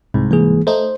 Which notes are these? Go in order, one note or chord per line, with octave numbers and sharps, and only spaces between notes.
C2 G#2
E3 A#3 G#4
A3 D#4 C5